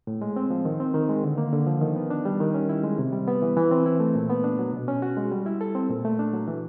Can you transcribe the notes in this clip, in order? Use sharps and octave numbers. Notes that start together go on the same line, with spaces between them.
A2
G#3
C4
F3
D#3
C4
D#3
G#3
D3
A#3
D3
F3
D#3
B3
D4
G3
D#3
C#4
E4
G#3
C3
G3
B3
E3
E3
C4
E4
A3
A#2
B3
D4
F#3
B2
C#4
F#4
G#3
G3
E4
A4
C4
A#2
A3
D4
F#3
E3